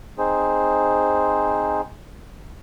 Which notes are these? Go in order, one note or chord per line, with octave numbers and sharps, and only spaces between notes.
C4 D#4 G#4 C5